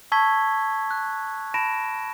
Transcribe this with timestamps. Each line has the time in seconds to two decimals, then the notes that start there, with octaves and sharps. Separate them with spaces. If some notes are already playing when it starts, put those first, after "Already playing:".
0.12 A5 C#6 E6 G#6 B6 G7
0.91 F#6
1.54 A5 B5 A#6 D7 E7